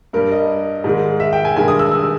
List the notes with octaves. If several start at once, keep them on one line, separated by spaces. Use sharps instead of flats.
G2 G3 A#4
D#5
G#2 D#3 G#3
E5
G5
G#5
G2 D#3 G#3 G#5
D#6
E6
E6